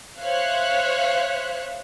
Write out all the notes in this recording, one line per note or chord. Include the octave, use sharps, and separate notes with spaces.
C5 C#5 E5 F5 F#6